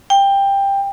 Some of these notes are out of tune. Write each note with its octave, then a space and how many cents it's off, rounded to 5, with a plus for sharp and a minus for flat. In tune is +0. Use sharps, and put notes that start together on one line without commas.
G5 +15